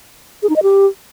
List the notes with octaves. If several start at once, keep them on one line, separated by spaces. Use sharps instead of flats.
G#4
D#4
D#5
G4